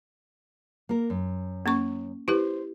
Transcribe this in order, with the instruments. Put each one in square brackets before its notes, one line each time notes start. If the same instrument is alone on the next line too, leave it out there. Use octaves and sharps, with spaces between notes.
[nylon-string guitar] A#3 A#4
F#2
[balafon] A#3 C#4 C#6
[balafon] E4 G4 B4 [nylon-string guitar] C5